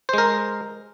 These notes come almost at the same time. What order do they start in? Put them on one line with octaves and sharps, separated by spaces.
C5 G#3 A#4